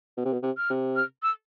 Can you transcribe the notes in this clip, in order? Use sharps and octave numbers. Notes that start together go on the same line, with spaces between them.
B2
C3
B2
C3
F6
C3
F6
E6